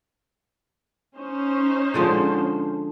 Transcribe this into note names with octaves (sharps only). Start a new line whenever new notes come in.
C#4 D#4 C5
D3 F3 G#3